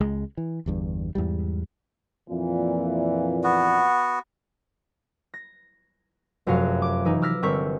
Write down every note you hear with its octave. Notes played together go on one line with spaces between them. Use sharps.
C#2 G#3
E3
G1 E2 G2
E2 G#2 G3
F2 A#2 E3
B3 F#4
A#6
F1 F#2 C3 F#4 F5
D6
E3 D#4
D6 E6 F6 A#6 B6
G1 C4 A#4 C#6 B6